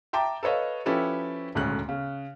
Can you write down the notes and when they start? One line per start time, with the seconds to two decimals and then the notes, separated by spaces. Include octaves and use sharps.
0.13 E5 G5 A5 A#5 D6
0.43 A4 B4 C#5 D#5 F5
0.86 F3 C#4 E4 G4 A4 B4
1.55 D#1 D2 G#2 C#4 F#6
1.89 C#3